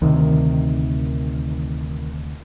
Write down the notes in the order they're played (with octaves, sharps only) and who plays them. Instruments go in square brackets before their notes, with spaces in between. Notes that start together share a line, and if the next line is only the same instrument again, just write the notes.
[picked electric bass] D2 C3 [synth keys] D#3